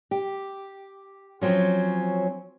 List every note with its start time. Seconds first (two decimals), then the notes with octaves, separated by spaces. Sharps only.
0.11 G4
1.41 F3 F#3 C4 C#4